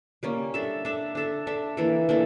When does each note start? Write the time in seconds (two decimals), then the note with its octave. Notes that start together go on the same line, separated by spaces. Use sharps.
0.23 G3 A#3 C#4
0.54 D4 A4 E5
0.85 D4 A4 E5
1.15 D4 A4 E5
1.47 D4 A4 E5
1.77 E3 A#3 D4 A4
2.09 E3 A#3 D4 A4